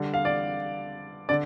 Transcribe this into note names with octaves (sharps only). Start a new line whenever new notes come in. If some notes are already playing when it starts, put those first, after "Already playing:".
Already playing: D3 G3
F5
D5
D3 D5